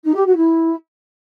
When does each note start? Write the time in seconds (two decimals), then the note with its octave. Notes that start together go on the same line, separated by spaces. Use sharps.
0.04 D#4
0.15 G4
0.26 F#4
0.37 E4